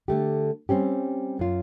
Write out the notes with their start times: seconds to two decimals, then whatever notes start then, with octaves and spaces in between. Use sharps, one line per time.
0.08 D3 A3 G4
0.69 G3 C4 C#4 G4
1.39 F#2 F4